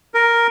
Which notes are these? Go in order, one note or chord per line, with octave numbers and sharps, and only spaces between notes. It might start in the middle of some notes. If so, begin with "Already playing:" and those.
A#4